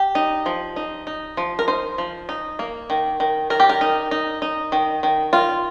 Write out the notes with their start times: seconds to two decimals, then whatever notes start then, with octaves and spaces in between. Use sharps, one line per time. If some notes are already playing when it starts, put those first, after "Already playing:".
Already playing: G4
0.15 D#4
0.46 F3
0.76 D#4
1.07 D#4
1.37 F3
1.59 A#4
1.68 D#4 C5
1.98 F3
2.29 D#4
2.59 A#3
2.90 D#3
3.20 D#3
3.50 D#3 A#4
3.60 G4
3.70 A#4
3.81 D#4
4.11 D#4
4.42 D#4
4.72 D#3
5.03 D#3
5.33 D#3 F4